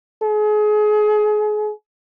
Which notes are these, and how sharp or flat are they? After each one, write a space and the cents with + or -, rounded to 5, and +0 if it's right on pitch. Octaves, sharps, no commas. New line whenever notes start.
G#4 +30